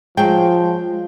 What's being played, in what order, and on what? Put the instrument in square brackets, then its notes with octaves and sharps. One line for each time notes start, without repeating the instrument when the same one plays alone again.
[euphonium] F3 [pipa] F#3 G5 [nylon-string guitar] G#3